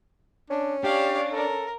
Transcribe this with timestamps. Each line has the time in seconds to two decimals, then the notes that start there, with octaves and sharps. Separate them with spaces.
0.50 C#4 D4
0.84 D4 G4 C#5 F5
1.32 A4 A#4